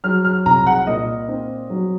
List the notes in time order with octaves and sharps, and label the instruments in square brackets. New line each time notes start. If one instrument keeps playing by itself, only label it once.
[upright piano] F#3 F6
F6
C2 A#5
F#5
A#2 D#5
C4
F#3